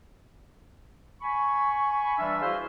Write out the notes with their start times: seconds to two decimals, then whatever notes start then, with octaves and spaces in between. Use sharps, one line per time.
1.22 G#5 B5 C#6
2.18 E3 G3 D4 F4 E5
2.41 E4 F#4 G#4 B4 C5 F5